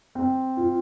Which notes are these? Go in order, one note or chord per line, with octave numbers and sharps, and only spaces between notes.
C4
F4